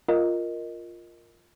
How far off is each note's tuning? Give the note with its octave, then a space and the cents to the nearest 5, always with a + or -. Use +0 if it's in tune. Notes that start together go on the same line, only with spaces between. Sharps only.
F4 +0 A#4 +0 D#5 +0